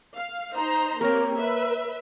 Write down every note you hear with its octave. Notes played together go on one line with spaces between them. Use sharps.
F5
D#4 C5 A#5
A#3 C4 G4 A#4 C#5 A#5
B4 E5